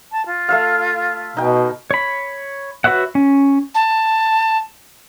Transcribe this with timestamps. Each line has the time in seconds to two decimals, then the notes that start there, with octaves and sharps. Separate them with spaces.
0.12 A5
0.26 F4
0.49 A3 E5 F5
1.37 B2 D#4 G5
1.91 C#5 B5
2.84 F#4 B4 C#5 E5 F#5
3.15 C#4
3.75 A5